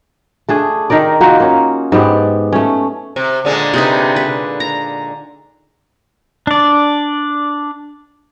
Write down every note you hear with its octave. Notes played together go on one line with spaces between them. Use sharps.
A3 D4 G#4
D#3 D#4 A#4 D5
A#3 D#4 F4 F#4
A#3 C#4
G#2 B3 G4 D5
A3 C#4
C3
A#2 D3 G#3
C3 D#4 B4
B4
A#5
D4 D5